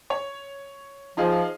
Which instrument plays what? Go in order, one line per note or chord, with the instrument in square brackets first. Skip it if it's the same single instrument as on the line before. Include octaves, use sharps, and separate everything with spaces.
[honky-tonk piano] C#5
[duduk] F3 [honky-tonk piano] D#4 F4 G#4